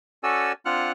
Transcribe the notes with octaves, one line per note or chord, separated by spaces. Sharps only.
C#4 F#4 A4 D5 G#5 E6
C4 D4 F4 F#5 F6 F#6